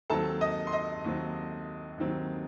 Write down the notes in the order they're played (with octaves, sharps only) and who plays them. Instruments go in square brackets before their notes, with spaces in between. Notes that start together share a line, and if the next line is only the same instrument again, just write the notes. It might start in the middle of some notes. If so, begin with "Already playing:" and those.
[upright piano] D#2 D#3 F#3 C4 A4 A5
D#5 D#6
C6
D#5 D#6
D#2 D#3 F#3 C4
D#2 D#3 F#3 C4